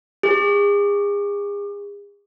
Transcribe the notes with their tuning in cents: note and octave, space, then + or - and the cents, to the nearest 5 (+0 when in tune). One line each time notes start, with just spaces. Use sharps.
G#4 -35 D6 +35